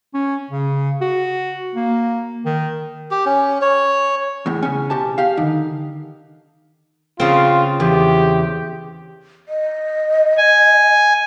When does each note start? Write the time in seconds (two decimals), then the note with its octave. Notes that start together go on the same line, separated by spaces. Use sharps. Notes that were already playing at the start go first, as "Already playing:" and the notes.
0.14 C#4
0.51 C#3
1.01 F#4
1.75 A#3
2.45 D#3
3.11 G4
3.26 C#4
3.61 C#5
4.46 E2 A2
4.62 C#3 C#4 G#5
4.90 B2 G4 A5
5.18 G4 F5
5.37 D3 D#3 D#4
7.20 C#3 C4 F4
7.80 E2 G4
9.48 D#5
10.38 G#5